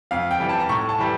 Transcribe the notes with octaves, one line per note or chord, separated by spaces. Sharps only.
F2 F5
G5
E3 G3
A5
A#5
A2 C#6
A5
E3 G3